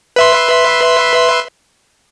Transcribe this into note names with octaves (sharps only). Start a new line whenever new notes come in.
B4 E5 C6